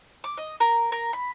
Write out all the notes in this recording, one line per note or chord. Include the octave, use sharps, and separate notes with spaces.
D6
D#5
A#4
A#4
B5